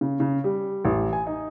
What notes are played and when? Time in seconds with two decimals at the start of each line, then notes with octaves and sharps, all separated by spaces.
0.01 C#3
0.20 C#3
0.44 G3
0.85 A1
1.13 G#5
1.27 D#4